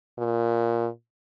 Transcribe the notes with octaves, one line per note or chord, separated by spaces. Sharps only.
A#2